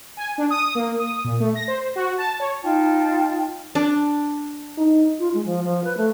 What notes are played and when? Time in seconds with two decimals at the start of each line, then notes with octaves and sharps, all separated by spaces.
0.17 G#5
0.38 D4
0.50 D#6
0.75 A#3
0.99 D#6
1.24 A#2
1.40 A3
1.55 A#6
1.68 C5
1.96 F#4
2.18 A5
2.40 C#5
2.62 D#4 F4 G5 A5
3.75 D4
4.78 D#4
5.19 F4
5.34 G#3
5.46 F3
5.64 F3
5.84 B4
5.97 A3